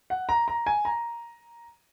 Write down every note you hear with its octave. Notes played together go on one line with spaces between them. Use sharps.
F#5
A#5
A#5
G#5
A#5